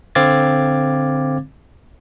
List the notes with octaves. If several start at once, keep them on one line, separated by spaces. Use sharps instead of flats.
D3 C4 F5 D6 G#6 A6